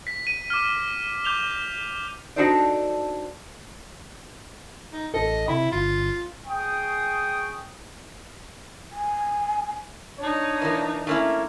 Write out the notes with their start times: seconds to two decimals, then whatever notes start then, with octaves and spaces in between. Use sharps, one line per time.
0.07 B6
0.27 D#7
0.50 D6 F6
1.25 D6 G6 F7 G7
2.36 D4 D#4 F#4 A4 C5 D5
4.93 D#4
5.14 A1 A4 D#5
5.48 C3 E4 B5
5.72 G1 F4
6.47 G#4 G5 C#6 D#6
8.93 G#5
10.19 D4 D#4 C#5
10.62 E3 A#3
11.07 A3 A#3 C#4 E4